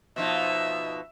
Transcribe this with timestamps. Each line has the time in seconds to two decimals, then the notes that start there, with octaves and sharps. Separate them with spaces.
0.16 B2 F3 D#4 E5